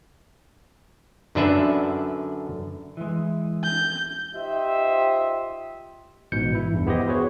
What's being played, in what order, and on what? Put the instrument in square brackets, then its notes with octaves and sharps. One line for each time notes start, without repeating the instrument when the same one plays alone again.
[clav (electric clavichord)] F#2 D3 D4 B4 E5
[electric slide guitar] E3 G#3
[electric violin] G6
[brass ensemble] D#4 F4 G4 C5 D#5 E5
[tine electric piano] A1 G#2 B2 G6 C#7
E3 E4
E2 G2
B3 E4 G4 C5 D#5
B3 E4 F#4 G#4 C5 C#5